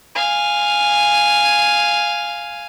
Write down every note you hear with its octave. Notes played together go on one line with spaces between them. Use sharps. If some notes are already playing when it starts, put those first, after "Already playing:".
F5 G#5